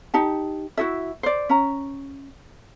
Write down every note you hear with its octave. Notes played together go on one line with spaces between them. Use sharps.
D#4 G4 A5
E4 F#4 G#4 E5
C5 D5
C#4 A#5